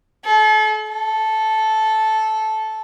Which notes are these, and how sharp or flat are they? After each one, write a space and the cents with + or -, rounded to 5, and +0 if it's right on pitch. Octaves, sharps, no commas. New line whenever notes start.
A4 -40
A4 -10